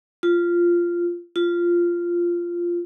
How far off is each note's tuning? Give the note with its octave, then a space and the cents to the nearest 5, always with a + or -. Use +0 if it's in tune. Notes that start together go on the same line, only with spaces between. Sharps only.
F4 -10
F4 -10